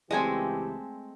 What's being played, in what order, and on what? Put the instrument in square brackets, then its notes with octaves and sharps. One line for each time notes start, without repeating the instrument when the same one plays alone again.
[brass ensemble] C#2 E3 G4 [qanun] G#3 A3 C4 [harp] D#5 G#5